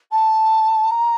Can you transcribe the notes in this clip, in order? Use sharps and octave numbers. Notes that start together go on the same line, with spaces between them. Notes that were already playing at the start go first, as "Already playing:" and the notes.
A5
A#5